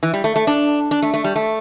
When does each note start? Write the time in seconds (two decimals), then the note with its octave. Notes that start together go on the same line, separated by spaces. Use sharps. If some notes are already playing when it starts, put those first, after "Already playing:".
0.03 E3
0.14 G3
0.24 A3
0.36 A3
0.47 D4
0.91 D4
1.02 A3
1.14 A3
1.24 G3
1.36 A3